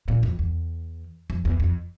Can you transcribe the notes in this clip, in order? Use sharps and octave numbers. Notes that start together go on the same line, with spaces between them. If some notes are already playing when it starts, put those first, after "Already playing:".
A#2
F2
E2
F2
E2
F2